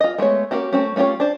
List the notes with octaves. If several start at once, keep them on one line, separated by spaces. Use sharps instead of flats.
F4 D#5
G#3 A3 B3 C#5
A#3 C4 C#4 F#4 G4
A3 C4 C#4
A3 C#4 F4 G4 C#5
D4 C5